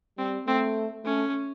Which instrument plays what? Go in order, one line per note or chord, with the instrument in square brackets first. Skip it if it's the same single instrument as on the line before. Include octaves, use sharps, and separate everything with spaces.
[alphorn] G3 [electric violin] C4
[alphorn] A3 [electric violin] C4
[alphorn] A3 [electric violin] C#4